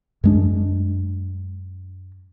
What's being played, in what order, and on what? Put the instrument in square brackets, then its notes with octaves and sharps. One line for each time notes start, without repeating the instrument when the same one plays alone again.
[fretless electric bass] F#2 G#3 D4